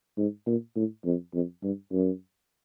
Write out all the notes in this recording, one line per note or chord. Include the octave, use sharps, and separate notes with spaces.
G#2
A#2
A2
F2
F2
G2
F#2